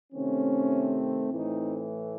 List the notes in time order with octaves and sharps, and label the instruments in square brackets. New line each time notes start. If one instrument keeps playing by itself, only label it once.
[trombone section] C3 D#3 A3 C4 C#4
A2 E3 A3 C4 D#4